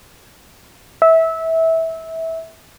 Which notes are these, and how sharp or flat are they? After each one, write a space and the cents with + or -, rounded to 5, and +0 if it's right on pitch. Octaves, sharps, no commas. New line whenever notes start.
E5 -20